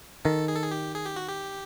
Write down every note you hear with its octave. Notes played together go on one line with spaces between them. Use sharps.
D#3 A4
G#4
A4
G#4
G4
G#4
G4
F#4
G4